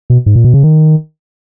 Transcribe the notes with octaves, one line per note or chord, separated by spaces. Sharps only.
B2
G#2
A#2
B2
C#3
D#3